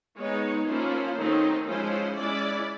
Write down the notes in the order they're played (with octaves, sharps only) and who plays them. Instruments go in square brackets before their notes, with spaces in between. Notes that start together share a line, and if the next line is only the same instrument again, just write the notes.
[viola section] G#3 B3 D#4 C#5
F3 A#3 C#4 E4 C5
D#3 F#3 A3 C4 D#4
F3 G#3 C#4 E4 C5
G#3 C#4 E4 D5